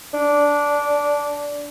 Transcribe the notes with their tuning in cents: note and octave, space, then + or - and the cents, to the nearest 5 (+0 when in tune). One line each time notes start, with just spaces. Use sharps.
D4 -10